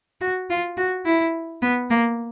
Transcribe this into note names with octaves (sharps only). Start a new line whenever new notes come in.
F#4
F4
F#4
E4
B3
A#3